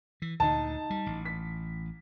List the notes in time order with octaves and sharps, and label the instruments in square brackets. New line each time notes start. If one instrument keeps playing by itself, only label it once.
[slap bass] E3
[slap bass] D2 A#2 D3 [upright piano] D#4 A5
[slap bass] G3
A1
[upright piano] B6